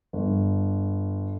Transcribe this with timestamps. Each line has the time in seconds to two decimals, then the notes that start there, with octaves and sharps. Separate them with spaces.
0.13 G1